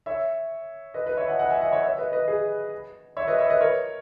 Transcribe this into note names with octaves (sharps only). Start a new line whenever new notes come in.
C#5 E5
B4 D#5
B4 D#5
C#5 E5
D#5 F#5
D#5 F#5
E5 G#5
D#5 F#5
C#5 E5
C#5 E5
B4 D#5
B4 D#5
G#4
C#5 E5
B4 D#5
C#5 E5
B4 D#5
A#4 C#5